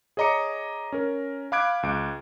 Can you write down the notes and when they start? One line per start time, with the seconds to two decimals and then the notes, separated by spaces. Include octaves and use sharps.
0.17 G#4 C#5 D#5 A#5 D6 C#7
0.92 C#4 A#4
1.52 F5 B5 D6 F#6 G#6 D7
1.83 C#2 D6 D7